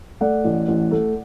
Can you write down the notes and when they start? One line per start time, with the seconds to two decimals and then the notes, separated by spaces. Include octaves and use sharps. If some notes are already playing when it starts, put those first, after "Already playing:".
0.21 A3 D5 F#5
0.45 A1
0.68 A1
0.91 A3